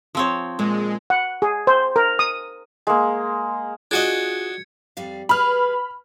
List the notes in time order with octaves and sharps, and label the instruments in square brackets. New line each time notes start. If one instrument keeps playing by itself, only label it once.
[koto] F3 C4 C#5
[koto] A#2 [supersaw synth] G#3
[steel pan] F#5
G#4
C5
A#4
D#6
[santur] G#3 A#3
[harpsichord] D4 F#4 D#5 [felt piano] F4 G#4 [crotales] G#6 C#7
[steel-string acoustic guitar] F2 G3 F5
[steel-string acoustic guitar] G#4 B4 [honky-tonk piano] B5 F6